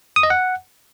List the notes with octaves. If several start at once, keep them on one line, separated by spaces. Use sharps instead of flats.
D#6
D#5
F#5